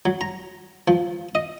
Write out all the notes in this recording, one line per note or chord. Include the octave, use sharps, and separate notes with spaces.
F#3
A#5
F3
D#5